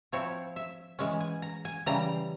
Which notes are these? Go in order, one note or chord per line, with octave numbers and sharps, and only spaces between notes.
F3 C4 E4 C#5
E5
E3 G#3 C#4
G#5
A#5
G#5
C#3 E3 G3 A#5